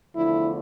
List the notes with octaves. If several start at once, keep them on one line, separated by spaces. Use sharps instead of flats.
E2 D3 F3 A3 E4